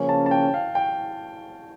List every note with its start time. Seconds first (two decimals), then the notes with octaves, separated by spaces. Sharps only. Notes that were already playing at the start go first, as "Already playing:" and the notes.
Already playing: C#3 F3 A#3 C#4
0.09 A5
0.26 A5
0.31 G5
0.54 F5
0.75 G5